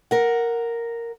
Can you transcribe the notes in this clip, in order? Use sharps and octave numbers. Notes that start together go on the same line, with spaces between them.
A#4 F#5